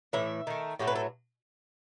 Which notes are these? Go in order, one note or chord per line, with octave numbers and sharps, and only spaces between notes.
A2 E3 E5
D#3 A3
A2 F#3 A3 G4
B4
A4